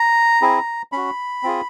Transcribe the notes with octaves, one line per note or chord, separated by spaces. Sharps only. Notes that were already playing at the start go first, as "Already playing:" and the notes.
Already playing: A#5
C4 E4 G#4
C#4 F#4 B5
C4 F4 G#4